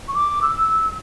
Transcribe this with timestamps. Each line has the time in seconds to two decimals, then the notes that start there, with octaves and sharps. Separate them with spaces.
0.08 C#6
0.14 D6
0.42 E6